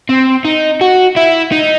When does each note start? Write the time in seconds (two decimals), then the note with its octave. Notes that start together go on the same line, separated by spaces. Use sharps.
0.09 C4
0.45 D#4
0.81 F#4
1.16 E4
1.52 D#4